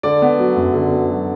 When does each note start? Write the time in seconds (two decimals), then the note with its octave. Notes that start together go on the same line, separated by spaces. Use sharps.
0.03 D3 D5
0.22 B3
0.39 F#3
0.56 F#2
0.74 D3
0.91 B3
1.10 F#3